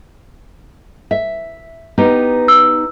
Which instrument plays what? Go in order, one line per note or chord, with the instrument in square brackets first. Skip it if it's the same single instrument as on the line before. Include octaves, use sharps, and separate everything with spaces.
[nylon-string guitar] E5
B3 D#4 G4
[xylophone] E6